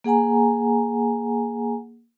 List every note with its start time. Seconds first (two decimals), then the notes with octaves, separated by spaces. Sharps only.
0.04 A#3 G#4 F#5 G#5 A#5